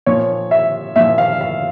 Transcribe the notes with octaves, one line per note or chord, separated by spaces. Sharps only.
A#2 F3 C#5
E5
A#2 F3 E5
F5
F5